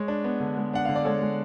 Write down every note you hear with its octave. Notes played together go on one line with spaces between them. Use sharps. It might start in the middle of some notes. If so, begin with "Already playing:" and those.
Already playing: G#3 C#5
D4
B3
D3
G#3
D4 F#5
D3 F5
D5
G#3 A4 C#5
G#3